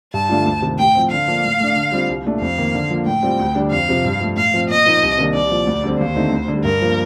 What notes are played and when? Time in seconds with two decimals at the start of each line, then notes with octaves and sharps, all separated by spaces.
0.13 G2 A5
0.29 D3 A3 D4 F4
0.46 D2
0.62 C3 D#3
0.79 A2 G5
0.95 F3 C4
1.11 D3 F5
1.28 F3 A#3 D4
1.44 A2
1.60 A3 D4
1.76 D3
1.92 G3 C4 F4
2.09 C2
2.25 A#2 A3 D4
2.41 F2 F5
2.58 D#3 A#3
2.75 D3
2.91 F3 A#3
3.06 A2 G5
3.23 G3 C4 F4
3.39 D2
3.55 D3 G3 D4
3.71 F2 F5
3.88 C3 F3 C4
4.05 G2
4.21 F3 A3
4.37 A2 F5
4.54 F3 C4
4.70 A#2 D#5
4.86 F3 A#3 D#4
5.03 C2
5.18 C3 D#3 A#3 D4
5.34 C2 D5
5.51 A#2 F3
5.67 D2
5.84 D3 G3 C4
6.00 D#2 C5
6.16 D3 A3 C4 D#4
6.32 D2
6.48 D3 G3
6.65 G2 A#4
6.81 F3 A#3